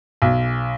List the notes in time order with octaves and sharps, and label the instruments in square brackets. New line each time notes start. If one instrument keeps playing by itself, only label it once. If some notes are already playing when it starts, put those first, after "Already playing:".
[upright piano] B1